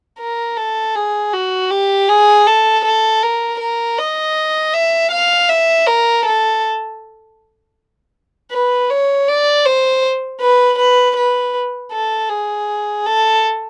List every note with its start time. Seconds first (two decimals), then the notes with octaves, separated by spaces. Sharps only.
0.20 A#4
0.57 A4
0.96 G#4
1.33 F#4
1.71 G4
2.09 G#4
2.47 A4
2.85 A4
3.23 A#4
3.60 A#4
3.98 D#5
4.74 E5
5.12 F5
5.49 E5
5.87 A#4
6.26 A4
8.52 B4
8.90 C#5
9.28 D5
9.66 C5
10.41 B4
10.79 B4
11.17 B4
11.92 A4
12.30 G#4
13.06 A4